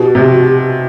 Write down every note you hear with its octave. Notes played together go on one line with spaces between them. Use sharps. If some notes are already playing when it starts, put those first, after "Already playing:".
Already playing: B2 G4
C3
F#4
G4